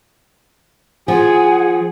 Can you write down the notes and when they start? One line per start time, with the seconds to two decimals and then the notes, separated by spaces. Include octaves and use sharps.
1.08 F3 G#4 F#5 G#5